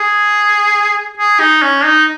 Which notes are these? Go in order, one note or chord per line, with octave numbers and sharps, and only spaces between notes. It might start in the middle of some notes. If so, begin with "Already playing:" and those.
Already playing: G#4
G#4
D#4
C#4
D#4